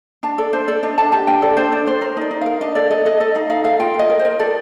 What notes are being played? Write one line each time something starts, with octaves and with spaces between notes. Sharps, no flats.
D4 A5
A4 D5
D4 C5
A4 D5
D4 D#5
D4 A5
G4 A5
D4 G5
A4 D5
D4 C5
D4 D5
A4 C5
A#4 C5
D#4 D5
D#4
A#4 F5
D4 D#5
A4 D5
A4 D#5
A4 D#5
A4 D#5
D#4 F5
D#4 F5
A4 F5
F4 G5
A#4
D#5
A#4
C5
A#4
A4 D5